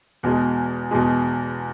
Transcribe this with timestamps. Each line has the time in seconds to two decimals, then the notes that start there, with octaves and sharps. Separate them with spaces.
0.23 E2 B2 G#3
0.91 E2 B2 G#3